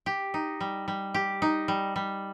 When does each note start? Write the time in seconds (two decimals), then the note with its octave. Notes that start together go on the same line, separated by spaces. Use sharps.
0.06 G4
0.34 D#4
0.61 G3
0.88 G3
1.14 G4
1.42 D#4
1.68 G3
1.96 G3